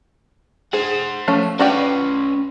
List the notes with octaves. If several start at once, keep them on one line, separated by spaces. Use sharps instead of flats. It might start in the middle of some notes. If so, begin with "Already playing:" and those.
G#4 C5 F#5
F3 A3 C#4
C#4 F#4 B4 D5 G5